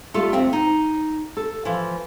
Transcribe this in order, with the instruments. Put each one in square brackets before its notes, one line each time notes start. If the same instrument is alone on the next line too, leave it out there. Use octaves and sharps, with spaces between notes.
[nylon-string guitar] G3 A3 F4 A4
F2 C4 F4 E5 G5
D#4
A4
E3 F3